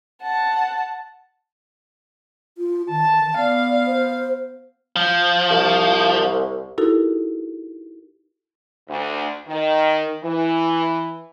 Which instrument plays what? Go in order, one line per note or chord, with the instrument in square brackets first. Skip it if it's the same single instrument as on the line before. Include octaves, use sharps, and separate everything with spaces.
[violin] F#5 A5
[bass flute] F4
[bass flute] D#3 [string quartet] A5
[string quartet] B3 F5 [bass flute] D5
[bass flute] C5
[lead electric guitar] F3
[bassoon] C2
[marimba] D#4 E4 F#4 G4 A4 A#4
[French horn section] D2
D#3
E3